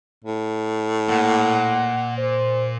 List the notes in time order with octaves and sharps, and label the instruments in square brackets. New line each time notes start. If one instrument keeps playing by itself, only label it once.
[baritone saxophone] A2
[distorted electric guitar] A#2 [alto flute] F#5
[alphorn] C5